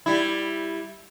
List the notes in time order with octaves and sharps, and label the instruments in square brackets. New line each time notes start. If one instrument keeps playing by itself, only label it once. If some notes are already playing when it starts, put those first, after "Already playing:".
[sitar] G3 E4